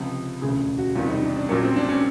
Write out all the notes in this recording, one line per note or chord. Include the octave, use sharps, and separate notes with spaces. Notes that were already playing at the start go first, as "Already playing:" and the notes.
Already playing: C#2 C3 F3
E1 D2 C#3 G#4
F#4
E2 C3 D#3 G3 F4
D#4
D4
D4
A#1 A#2 F#3 A#3 C#4
C4
D4
C#4